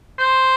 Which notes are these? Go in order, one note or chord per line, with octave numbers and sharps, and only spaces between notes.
C5